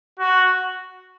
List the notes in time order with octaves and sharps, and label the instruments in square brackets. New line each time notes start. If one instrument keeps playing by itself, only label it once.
[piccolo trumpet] F#4